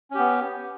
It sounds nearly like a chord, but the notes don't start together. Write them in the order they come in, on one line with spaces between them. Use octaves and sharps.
C#4 G4 B3